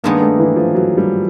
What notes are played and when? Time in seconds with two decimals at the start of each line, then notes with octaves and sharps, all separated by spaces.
0.04 G2 D#3 G#3 A#3 B3
0.21 A3
0.39 E3
0.56 F3
0.75 F#3
0.98 G3